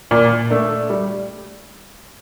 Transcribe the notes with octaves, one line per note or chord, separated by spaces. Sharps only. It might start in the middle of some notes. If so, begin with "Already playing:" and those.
A#2
A3 D4
G3